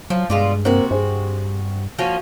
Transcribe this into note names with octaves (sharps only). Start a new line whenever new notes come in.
F3 F#3
G2 B2 G#3 F4 D5
C3 A#3 C4 F#4
G2 G#4 C5
F3 A#3 C#4 F#4